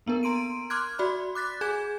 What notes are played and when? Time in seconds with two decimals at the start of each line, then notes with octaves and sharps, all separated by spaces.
0.06 A#3 B3 D4 A#4
0.23 A#5 C6 D7 D#7
0.70 C6 D6 F6 F#6 G#6
0.99 F#4 D5 B5 C6
1.35 D6 F#6 A6 B6
1.61 G#4 G#5 G6 G#6 E7